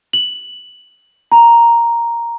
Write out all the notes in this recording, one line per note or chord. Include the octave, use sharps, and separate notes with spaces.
F#7
A#5